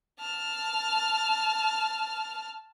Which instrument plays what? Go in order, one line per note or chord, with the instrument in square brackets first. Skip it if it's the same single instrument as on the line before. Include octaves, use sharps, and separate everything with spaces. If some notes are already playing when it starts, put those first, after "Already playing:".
[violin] A5 F6